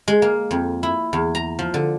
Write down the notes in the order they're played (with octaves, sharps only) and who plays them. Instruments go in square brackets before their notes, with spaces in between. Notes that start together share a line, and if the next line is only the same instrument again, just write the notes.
[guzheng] G#3
A#3
F2
E4
E2
A#5
F3
D3